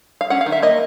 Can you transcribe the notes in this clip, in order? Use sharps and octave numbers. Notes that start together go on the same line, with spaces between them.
F5
C#4 F#5
F5
D#3
E5
A#3 D#5